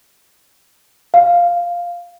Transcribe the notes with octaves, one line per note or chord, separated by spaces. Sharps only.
F5